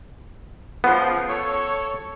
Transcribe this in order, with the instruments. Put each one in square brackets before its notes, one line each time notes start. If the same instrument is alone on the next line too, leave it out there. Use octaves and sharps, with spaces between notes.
[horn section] C#3 F3 [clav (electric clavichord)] B3
[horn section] A4 C#5